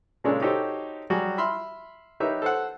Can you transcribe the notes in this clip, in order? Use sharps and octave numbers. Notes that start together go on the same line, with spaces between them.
A#2 C#3 G#3 D4 A4 C#5
D#4 F#4 G4 A4 C5 C#5
F#3 G3 F#4 G#4
E5 B5 C6 F6
D#4 G4 A#4 B4 C#5 E5
A4 C5 F#5